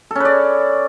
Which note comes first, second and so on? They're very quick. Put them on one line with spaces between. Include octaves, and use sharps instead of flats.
A4 C#4 B4 D5